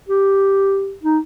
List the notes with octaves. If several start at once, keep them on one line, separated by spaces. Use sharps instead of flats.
G4
D#4